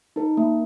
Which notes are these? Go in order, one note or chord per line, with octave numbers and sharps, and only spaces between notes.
D#4 A#4
A#3